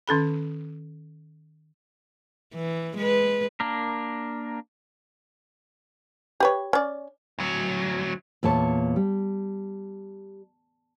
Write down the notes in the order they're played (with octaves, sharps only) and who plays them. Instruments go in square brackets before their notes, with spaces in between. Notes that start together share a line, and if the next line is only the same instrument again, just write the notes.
[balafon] D#3 C#4 A4 B5
[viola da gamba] E3
G#3 B4
[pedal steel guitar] A#3 D4 A#4
[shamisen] G4 B4 C#5
C#4 D5
[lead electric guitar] D2 F#3
[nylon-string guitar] E2 A#2 C#5 A5
G3